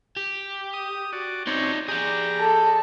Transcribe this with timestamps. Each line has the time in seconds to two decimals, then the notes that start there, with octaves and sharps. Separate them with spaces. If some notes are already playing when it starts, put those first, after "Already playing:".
0.16 G4
0.73 D#6
1.13 F#4 D5
1.47 C4 D#4 C#5 D5
1.88 G4 G#4 D5 A#5
2.40 A4